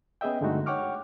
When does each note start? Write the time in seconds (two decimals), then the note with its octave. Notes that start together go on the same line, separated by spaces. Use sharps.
0.21 B3 C#4 G#4 D#5 E5 G5
0.41 G2 D3 G#3 A3 D#4 F#4
0.66 C#5 F#5 G5 C#6 D6 F6